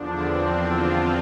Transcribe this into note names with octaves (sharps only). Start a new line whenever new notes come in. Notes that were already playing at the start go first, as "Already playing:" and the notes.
Already playing: E2 D3 F3 D4
C4
F4